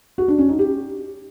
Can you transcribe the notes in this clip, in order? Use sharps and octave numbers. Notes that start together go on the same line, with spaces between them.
F#4
D4
C#4
D#4
G4